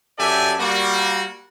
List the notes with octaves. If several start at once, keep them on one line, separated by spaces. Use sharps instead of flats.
F#2 G4 A4 D5 E5 G#5
G3 A#3 F#4